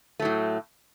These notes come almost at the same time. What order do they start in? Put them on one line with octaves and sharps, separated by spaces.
A3 F#3 A2